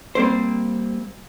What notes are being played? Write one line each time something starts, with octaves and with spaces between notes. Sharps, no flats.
G3 A#3 C4 C5